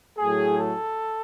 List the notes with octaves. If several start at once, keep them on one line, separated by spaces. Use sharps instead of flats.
A2 F#3 A3 G#4
A4